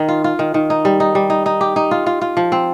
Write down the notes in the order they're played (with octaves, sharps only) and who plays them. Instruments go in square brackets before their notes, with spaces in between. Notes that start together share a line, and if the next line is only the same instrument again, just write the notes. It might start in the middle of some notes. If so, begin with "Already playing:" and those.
Already playing: [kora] D#3 D#4
F4
F4
D#3
D#3
D#4
G3
D#4
G3
D#4
D#4
G4
D#4
F4
F4
F4
F3
C4